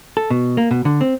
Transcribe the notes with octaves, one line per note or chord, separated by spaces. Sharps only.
A4
B2
A#3
B2
D3
C4